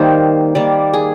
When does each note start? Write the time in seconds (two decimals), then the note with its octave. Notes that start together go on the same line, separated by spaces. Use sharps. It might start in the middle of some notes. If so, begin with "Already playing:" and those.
Already playing: D#3 G3 A#3 C5
0.55 D#3 G3 A#3 D5
0.93 G#4